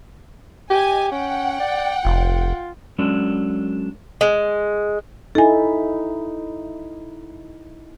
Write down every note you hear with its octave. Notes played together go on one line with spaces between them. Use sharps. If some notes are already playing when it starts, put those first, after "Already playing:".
G4 D#5 G#5
C#4 F#5 G5
D5
F1 F4
F#3 G#3 C#4 D4 A4
G#3
D#4 E4 A4 G#5